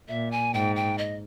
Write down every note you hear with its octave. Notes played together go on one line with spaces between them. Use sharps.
A#2 E5
G#5
G#2 G5
G5
D#5